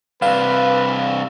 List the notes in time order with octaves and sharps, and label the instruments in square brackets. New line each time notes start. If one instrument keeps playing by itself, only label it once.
[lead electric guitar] G2 C3 [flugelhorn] B4 [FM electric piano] F5